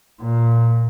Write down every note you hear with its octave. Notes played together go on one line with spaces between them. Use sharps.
A#2